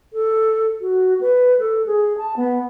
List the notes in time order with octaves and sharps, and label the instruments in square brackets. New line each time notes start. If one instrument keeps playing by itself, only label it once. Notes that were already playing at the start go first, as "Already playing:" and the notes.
[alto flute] A4
F#4
B4
A4
G#4
A5
B3